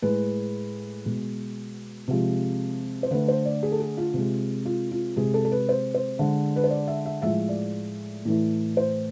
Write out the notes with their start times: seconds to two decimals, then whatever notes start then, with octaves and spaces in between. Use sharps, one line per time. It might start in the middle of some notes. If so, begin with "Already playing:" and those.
0.02 A2 G#3 B4
1.05 B2 G#3
2.08 C3 F3 G#3
3.03 C5
3.11 D3 A3 B4
3.28 C5
3.45 D5
3.63 G#4
3.72 A4
3.80 G#4
3.97 F4
4.14 C3 G#3
4.65 F4
4.91 F4
5.16 C3 G#3 G#4
5.34 A4
5.45 A4
5.52 B4
5.69 C5
5.94 C5
6.19 D3 G#3
6.56 B4
6.64 C5
6.70 D5
6.88 E5
7.05 E5
7.22 A2 F3 G#3 E5
7.49 D5
8.25 A2 E3 A3
8.77 C5